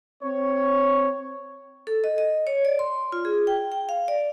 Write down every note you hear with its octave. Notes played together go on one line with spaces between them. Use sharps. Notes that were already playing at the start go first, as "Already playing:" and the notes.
C4 C#5
A4
D#5
D#5
C#5
D5
C6
F4
G#4
G5
G5
F5
D5